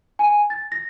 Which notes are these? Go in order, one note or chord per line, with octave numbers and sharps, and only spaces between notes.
G#5
A6
A#6